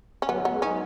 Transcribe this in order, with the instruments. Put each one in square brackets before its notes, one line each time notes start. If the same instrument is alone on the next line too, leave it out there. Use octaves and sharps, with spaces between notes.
[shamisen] C#4
[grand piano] F#3 [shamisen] B3
[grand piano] F#3
[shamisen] B3
[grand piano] G#3
[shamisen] C#4 [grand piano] D#4